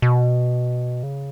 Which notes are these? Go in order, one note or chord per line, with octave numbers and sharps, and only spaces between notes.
B2
C#3